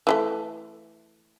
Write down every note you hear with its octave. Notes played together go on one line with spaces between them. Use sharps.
E3 F3 A3